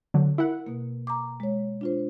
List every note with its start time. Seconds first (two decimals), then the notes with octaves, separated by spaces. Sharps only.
0.14 D3 F#3
0.38 E4 A#4 F#5
0.67 B2 A#3
1.07 A#5 D6
1.40 G#3 C#5
1.81 D4 F4 C5